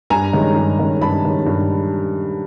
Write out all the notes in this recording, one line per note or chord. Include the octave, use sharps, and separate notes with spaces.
G2 G#5 A#5
D#3 G#3 C#4
G2
D#3 G#3 C#4
G2 A5 B5
D#3 G#3 C#4
G2